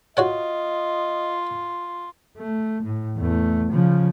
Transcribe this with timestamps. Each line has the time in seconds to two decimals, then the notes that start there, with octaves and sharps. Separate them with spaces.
0.17 F4 F#4 C#5 D#5 F#5
2.38 A3
2.83 A2
3.17 E2 A3
3.72 C#3 F3